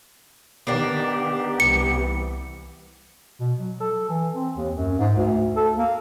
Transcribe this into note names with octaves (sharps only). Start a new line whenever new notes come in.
D#3 A#3 B3 D4 G4
C2 C3 E3 C#7
B2
F#3
A4
E3
C4
D#2
F#2
G#2
D2
A4
A#3